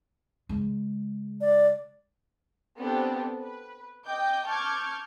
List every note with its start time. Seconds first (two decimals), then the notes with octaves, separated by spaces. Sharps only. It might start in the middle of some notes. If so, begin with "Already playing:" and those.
0.49 C#3 G#3
1.41 D5
2.78 B3 C4 D4 G4 A4
3.40 B4
4.06 D#5 G5 D6 G6
4.45 A5 C#6 D6 F6 G6 G#6